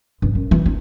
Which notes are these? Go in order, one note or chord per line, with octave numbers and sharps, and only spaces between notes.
G2
F#2
E3
D#4